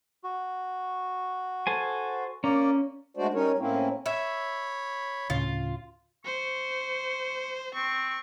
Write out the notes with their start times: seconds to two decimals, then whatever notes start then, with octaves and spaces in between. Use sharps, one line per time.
0.24 F#4
1.67 A4 C5 G#5
2.44 A#3 C#4 D5 A#5
3.17 G#3 A3 D4 F#4 C5 D5
3.34 G3 C#4 D#4 A#4 C#5
3.58 A2 A#3 C4 C#4 E4
4.06 C#5 E5 B5
5.30 D2 A2 C#3 F4
6.25 C5 C#6
7.74 C4 C#6